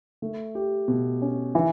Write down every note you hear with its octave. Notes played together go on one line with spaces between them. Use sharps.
A3
G4
B2
C#4
E3